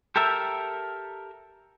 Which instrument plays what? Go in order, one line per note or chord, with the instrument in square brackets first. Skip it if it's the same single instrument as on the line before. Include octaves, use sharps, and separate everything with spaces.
[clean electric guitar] G4 A4 A#4 E5